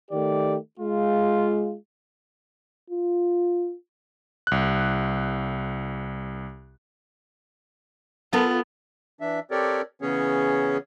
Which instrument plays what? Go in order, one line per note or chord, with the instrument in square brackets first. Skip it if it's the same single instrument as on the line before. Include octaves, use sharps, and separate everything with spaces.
[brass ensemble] D#3 A3 G4 D5
G#3 F4
[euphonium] F4
[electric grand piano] C2 F#6
[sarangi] B3 [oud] F4 A4 A#4
[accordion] E3 D4 E5
C4 G4 A4 A#4 C#5 D5
C#3 E3 B3 C#4 G#4 C#5